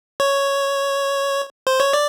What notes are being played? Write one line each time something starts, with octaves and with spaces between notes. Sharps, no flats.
C#5
C5
C#5
D5